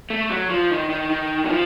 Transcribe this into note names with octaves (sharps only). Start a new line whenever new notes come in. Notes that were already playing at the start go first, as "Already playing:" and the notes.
A3
F#3
F3
D#3
D#3
D#3
F#3
F3